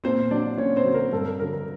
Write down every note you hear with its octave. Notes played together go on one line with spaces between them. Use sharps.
A#2 C4 C5
F#3 D4 D5
A#2 C#4 C#5
C4 C5
F#3
A#4
G2 A4
A#4
D3 F#3 A#4
A#4